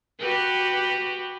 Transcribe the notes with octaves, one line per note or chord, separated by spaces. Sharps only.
F#4 G4 B4